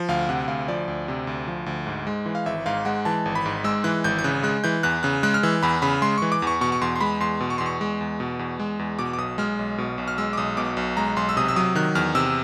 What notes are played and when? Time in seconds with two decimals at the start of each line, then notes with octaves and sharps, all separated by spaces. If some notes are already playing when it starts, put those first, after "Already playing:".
Already playing: F3
0.08 D2 F5
0.29 C3 F#5
0.48 D2 F5
0.68 F3 D5
0.88 D2
1.08 C3
1.27 D2
1.48 F3
1.66 D2
1.87 G#2
2.07 G#3
2.26 E3
2.35 F5
2.46 G#1 E5
2.66 G#2 F5
2.85 G#3 F#5
3.05 E3 A5
3.26 G#1
3.35 B5
3.46 G#2
3.64 G#3 E6
3.84 E3 F#6
4.04 G#1 G6
4.19 G6
4.24 C#3 F#6
4.43 G#3 F#6
4.64 E3 G6
4.83 E2 F#6
5.03 C#3 F#6
5.23 G#3 F#6
5.34 F6
5.43 E3 E6
5.63 E2 B5
5.82 C#3 B5
6.02 G#3 C6
6.18 E3 C#6
6.32 D6
6.42 E2 C#6
6.61 B2 C#6
6.72 C#6
6.81 E2 C6
6.96 C6
7.01 G#3 B5
7.20 E2 C6
7.40 B2
7.50 C#6
7.58 E2 C6
7.66 C#6
7.81 G#3
8.01 E2
8.20 B2
8.39 E2
8.60 G#3
8.79 E2
8.99 B2 D6
9.13 D6
9.18 B1 D#6
9.38 G#3 F6
9.59 B1
9.78 B2
9.98 B1
10.08 F6
10.18 G#3 E6
10.33 D6
10.37 B1 D#6
10.57 B2 D6
10.77 B1
10.97 G#3 A#5
11.16 B1 C6
11.29 E6
11.37 C3 D#6
11.48 E6
11.56 F#3 D#6
11.75 D#3 F#6
11.95 E2 F6
12.15 C3 E6